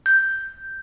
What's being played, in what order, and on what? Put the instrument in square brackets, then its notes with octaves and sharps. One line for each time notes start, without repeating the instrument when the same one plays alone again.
[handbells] G6